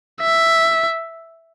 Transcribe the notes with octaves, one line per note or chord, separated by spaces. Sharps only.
E5